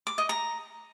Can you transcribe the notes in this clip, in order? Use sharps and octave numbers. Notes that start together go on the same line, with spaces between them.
D6
D#5
A#5